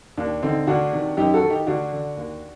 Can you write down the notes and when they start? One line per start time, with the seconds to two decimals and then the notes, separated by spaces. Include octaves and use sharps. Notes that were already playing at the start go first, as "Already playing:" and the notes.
0.17 D#2 D4
0.43 D3 C4 D#4
0.67 D2 D4 F#4
0.92 C3 D#3
1.17 F#2 D#4 G4
1.34 F#4 A4
1.42 D#3
1.50 D#4 G4
1.67 D2 D4 F#4
1.92 D3
2.17 D#2